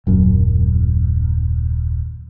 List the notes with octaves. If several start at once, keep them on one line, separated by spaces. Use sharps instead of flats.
D#1 F#2